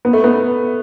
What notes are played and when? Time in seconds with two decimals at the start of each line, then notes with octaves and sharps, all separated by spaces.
0.05 B3
0.13 A3
0.24 B3